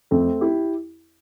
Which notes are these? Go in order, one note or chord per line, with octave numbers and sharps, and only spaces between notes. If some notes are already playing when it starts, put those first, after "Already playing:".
F2 A3 C4
E4 G4